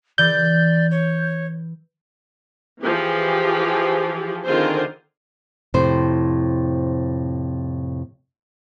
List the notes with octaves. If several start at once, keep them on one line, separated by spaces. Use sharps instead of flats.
E3 D5 G6
C#5
E3 F3 G4 G#4
D3 D#3 C4 F4 G#4 C5
F2 A2 C3 C5